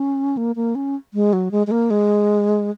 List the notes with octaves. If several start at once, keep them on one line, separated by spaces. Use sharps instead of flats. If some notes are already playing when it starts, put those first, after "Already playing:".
Already playing: C#4
A#3
A#3
C#4
G#3
F#3
G#3
G#3
A#3
G#3